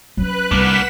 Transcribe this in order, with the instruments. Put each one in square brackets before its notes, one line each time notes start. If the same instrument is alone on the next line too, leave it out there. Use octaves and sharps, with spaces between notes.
[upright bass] F#3 C#4 [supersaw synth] B4 F#6
[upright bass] C2 [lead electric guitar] A#3 D4 [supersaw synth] F#5 B6 E7